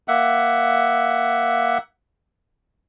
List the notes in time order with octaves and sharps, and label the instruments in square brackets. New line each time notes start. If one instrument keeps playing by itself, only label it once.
[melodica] A#3 E5 F#5